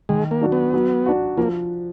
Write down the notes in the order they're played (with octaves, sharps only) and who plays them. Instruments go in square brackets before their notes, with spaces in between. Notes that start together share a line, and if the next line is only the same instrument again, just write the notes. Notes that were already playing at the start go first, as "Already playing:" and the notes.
[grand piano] D#3 [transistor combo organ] G#3
[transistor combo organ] A#3
[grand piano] F#3 D4 F#4
[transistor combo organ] B3
[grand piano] F#3
D4 F#4
[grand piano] F3 [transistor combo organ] A#3